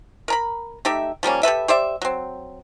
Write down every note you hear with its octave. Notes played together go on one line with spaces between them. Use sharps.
A#4 A#5 B5
A3 D#4 G4 E5
F3 G3 A#3 C#4
G4 A4 B4 E5
G4 C5 D5 E5
F#3 C4